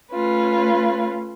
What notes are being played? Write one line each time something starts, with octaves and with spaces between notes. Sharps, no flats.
A3 C#4 F4 B4